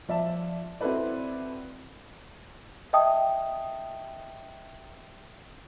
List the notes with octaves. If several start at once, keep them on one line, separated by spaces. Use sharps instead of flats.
F3 D5 E5 A5
C4 E4 F#4 A4 B4 D5
D#5 E5 G5 A5 D#6